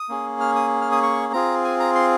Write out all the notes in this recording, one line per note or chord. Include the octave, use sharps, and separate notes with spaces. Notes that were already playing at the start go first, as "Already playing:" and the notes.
Already playing: D#6
A#3 C#4 G#4
F6
D#6
F6
D#6
C#6
C4 F4 G#4 A#5
G#5
A#5
C6